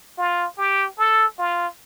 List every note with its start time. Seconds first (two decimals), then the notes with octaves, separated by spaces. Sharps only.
0.18 F4
0.58 G4
0.98 A4
1.39 F4